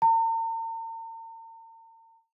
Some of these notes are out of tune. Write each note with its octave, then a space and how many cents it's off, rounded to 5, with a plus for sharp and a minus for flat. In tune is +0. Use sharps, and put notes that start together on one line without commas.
A#5 -45